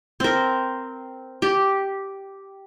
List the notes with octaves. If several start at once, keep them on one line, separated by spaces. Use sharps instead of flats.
C4 A#4
G4